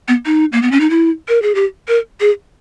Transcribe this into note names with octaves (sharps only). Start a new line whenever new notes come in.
B3
D#4
A#3
B3
C#4
D#4
E4
A#4
G#4
G4
A#4
G#4